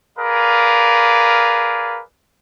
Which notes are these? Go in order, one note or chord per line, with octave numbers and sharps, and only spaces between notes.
G#4 A#4 B4 D5 F5